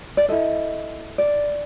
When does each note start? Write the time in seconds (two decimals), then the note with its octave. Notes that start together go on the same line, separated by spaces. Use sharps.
0.17 D5
0.29 E4 A4 D#5
1.18 D5